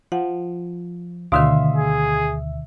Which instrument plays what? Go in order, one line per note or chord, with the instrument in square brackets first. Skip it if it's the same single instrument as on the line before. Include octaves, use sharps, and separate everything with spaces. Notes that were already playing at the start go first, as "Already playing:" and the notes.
[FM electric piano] F3 [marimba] F#5
[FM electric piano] D2 E5 [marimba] B2 D3 D#3 [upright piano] F5 C6 D#6
[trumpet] G#4